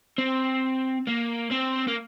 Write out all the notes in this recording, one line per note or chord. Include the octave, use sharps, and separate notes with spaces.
C4
A#3
C4
A#3